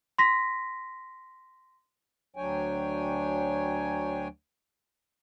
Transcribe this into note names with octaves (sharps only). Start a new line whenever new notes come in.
C6 A#6 B6
D2 F#3 D4 C#5 G5 G#5